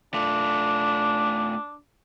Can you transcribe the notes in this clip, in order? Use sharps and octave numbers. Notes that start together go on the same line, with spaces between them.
A3 D4 F4